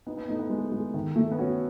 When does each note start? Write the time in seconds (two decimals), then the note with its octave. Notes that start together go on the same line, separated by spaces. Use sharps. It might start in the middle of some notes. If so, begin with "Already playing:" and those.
0.07 B3 D#4
0.17 B3
0.28 A3 D#4
0.39 B3
0.50 G#3
0.72 G#3
0.94 D#3
1.16 A3
1.31 B3
1.39 C#4 F#4